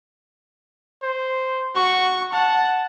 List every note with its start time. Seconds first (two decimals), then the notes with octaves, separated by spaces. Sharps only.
1.03 C5
1.75 F#4 C#6
2.33 F#5 A5